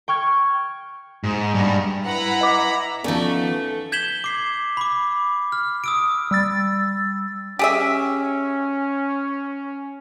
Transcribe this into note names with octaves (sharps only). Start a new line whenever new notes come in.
G5 C#6 F6 G#6
G#2
G2
E4 B4 F#5 A#5 B5
D#5 D6
F3 A3 B3 C#4 D#4 D5
G6 G#6 B6 E7 F#7 G7
D6 C7
B5 D6
F6
D#6 E6 D7
G3 E6 A6
C#4 G4 G#4 E5